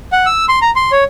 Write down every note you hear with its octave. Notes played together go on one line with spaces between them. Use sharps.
F#5
E6
C6
A#5
C6
C#5